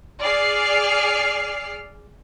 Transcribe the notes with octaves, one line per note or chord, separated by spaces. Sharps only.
G#4 D5 F6 C7